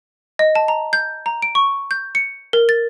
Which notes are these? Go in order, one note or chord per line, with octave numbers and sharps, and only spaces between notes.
D#5
A5
A#5
G6
A#5
D7
C#6
G6
C#7
A#4
A6